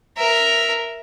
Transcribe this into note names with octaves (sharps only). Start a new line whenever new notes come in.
A#4 E5